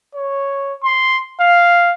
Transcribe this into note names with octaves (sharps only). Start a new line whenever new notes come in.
C#5
C6
F5